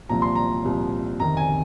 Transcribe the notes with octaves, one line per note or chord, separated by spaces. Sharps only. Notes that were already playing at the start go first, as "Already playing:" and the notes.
C2 A#2 F3 A#5
C6
A#5
C2 A#2 F3
F2 C3 D#3 A#5
G#5